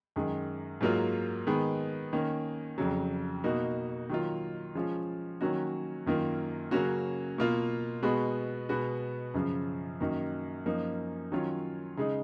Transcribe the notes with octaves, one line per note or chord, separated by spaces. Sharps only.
F#2 D#3 G#3
G#2 F#3 A#3 F4
D#3 G#3 B3
D#3 A#3 C#4
F2 C#3 F#3
B2 A#3 D#4 F#4
D#3 F#3 A#3 F4
F3 G#3 C#4 F4
D#3 F#3 A#3 C#4 F#4
F#2 D#3 A#3 F4
C#3 F#3 A#3 C#4 F#4
B2 A#3 F4
B2 G#3 B3 F#4
B2 G#3 B3 F#4
F#2 C#3 F3
F#2 D#3 A#3 D#4 F#4
F#2 F3 A#3 D#4
D#3 F#3 C#4 F4
C#3 G#3 D#4